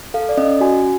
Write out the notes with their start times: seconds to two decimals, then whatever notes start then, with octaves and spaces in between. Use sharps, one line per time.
0.14 A4 F5
0.29 D5
0.37 C#4 D#5
0.61 F#4 G#5